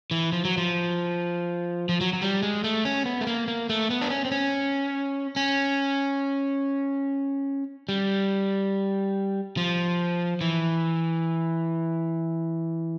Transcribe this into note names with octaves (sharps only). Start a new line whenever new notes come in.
E3
F3
F#3
F3
F3
F#3
F#3
G3
G#3
A3
C#4
B3
A3
A#3
A#3
A3
B3
D4
C#4
C4
C#4
C#4
G3
F3
E3